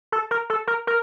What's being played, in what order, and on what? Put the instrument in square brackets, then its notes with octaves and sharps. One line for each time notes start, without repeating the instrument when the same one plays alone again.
[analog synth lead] A4
A#4
A4
A#4
A#4